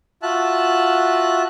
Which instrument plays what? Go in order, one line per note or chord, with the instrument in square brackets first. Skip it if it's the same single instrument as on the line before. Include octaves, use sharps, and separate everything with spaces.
[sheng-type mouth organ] F4 F#4 E5 A5 F#6